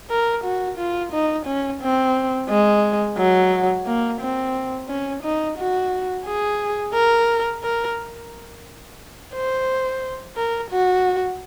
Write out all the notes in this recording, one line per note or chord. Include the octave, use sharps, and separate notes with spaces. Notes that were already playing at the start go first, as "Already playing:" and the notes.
A#4
F#4
F4
D#4
C#4
C4
G#3
F#3
A#3
C4
C#4
D#4
F#4
G#4
A#4
A#4
C5
A#4
F#4